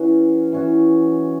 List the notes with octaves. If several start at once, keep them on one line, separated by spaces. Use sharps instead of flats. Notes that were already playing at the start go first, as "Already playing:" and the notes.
Already playing: E3 C#4 F#4
E3 C#4 F#4